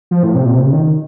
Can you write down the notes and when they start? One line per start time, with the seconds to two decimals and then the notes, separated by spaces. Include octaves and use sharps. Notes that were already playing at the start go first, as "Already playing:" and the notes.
0.11 F3
0.23 A2
0.35 C3
0.46 A#2
0.55 C3
0.64 C#3
0.72 D#3